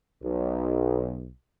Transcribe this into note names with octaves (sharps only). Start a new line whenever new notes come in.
B1